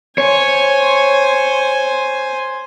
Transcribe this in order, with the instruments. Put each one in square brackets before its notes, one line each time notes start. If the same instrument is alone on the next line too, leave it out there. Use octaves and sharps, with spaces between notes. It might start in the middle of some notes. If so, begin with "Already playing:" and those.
[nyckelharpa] C5 G#5 [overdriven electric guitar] C#5